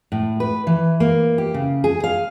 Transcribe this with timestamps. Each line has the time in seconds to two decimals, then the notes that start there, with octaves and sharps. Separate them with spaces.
0.12 A2
0.40 B4
0.67 E3
1.00 A#3
1.38 G4
1.54 C#3
1.84 G#4
2.04 F5